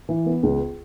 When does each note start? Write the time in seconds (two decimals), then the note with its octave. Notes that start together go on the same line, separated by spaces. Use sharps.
0.09 E3
0.26 B3
0.43 C#2